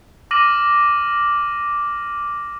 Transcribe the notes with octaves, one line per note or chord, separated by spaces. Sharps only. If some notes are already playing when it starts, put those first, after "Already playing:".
D6 F6 A#6 D#7 F#7